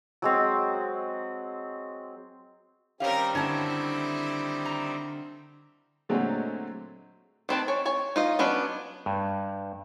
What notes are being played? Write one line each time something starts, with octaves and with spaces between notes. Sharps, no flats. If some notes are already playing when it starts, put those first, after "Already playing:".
F#3 G#3 C4
D#3 G3 C4 C#4 G4 A#4 F5
D3 C#4 E4 A5
A#5
A#2 D3 F#3 G#3 A3 C4
D#3 C4 B4 A5
C#5 G#5
C#5 G#5
D#4 F4 D#5
F#3 B3 C#4 D4 B4
G2